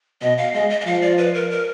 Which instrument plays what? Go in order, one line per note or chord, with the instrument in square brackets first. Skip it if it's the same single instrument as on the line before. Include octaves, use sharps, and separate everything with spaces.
[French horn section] B2 [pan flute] D#5
[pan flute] F5
[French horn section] G#3 [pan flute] D#5
[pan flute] D#5
D#5
[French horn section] F3 [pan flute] F5
[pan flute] D5
B4
A#4
A#4